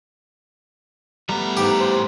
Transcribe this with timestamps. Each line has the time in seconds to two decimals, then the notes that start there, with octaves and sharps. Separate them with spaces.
1.29 A2 G3 A3 B3 A#5
1.57 G#2 G4
1.80 C5